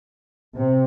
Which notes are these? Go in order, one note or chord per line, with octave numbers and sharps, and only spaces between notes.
C3